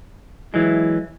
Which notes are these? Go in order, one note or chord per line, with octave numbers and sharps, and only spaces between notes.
E3 F#3 G#3 E4